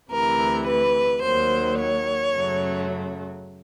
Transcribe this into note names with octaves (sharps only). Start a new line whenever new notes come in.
D2 C3 E3 A#4
B4
D#2 D#3 F#3 C5
C#5
F#2 C#3 F#3 A3